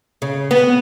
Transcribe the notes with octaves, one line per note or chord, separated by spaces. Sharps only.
C#3
B3